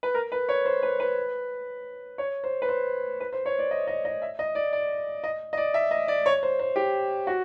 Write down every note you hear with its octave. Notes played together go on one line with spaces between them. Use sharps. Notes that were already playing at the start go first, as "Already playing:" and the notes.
B4
A#4
B4
C#5
C5
B4
B4
C#5
C5
B4
C5
B4
C5
C#5
D5
D#5
D#5
D#5
E5
D#5
D5
D5
D#5
D#5
D5
E5
D#5
D5
C#5
C5
C5
G4
F#4